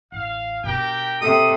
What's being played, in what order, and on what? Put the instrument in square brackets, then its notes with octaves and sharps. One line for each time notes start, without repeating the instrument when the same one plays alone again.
[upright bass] A1 [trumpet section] F5
[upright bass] B2 D4 [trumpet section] G4 A#4 G5
[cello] C3 A4 [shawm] D#6